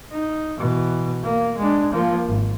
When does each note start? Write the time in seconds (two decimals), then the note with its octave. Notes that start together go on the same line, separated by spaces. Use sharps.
0.12 D#4
0.58 B2 E3
1.23 A#3
1.57 G#3 D4
1.92 F3 A#3
2.26 G#1